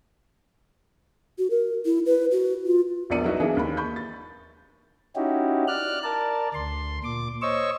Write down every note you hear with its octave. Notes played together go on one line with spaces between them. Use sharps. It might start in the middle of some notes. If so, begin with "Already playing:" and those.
F#4
A#4
E4
B4
F#4
F4
E1 A#1 E2 D5 C#7 D#7
F#3 B3 D#4 E4 F#4
E3 A#3 D4 G#4
D#2 B5
B5 C#6 G6
A6
C#4 D#4 E4 F#4 G4
D5 F6 F#6
A#4 D5 A5
D2 C6
A#2 D6
C5 C#5 D#5 C#6 E6